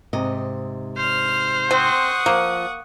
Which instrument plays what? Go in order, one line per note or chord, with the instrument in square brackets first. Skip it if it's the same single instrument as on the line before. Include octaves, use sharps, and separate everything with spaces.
[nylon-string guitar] G#2 C3 D#5
[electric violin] C5 [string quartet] F6
[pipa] C4 [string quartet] F#5 C#6 D#6
[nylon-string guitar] F3 [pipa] A#3